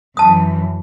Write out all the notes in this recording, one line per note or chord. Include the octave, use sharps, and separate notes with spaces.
F#2 E3 A5 D#6